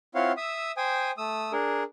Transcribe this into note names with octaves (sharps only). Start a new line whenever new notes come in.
C4 E4 F4 C#5 F5 F#5
E5 D#6 E6
C5 G5 G#5 D#6
A3 D#6 E6
D4 G#4 A#4